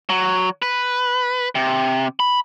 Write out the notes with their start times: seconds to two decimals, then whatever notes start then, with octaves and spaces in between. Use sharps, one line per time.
0.09 F#3
0.62 B4
1.55 C3
2.20 B5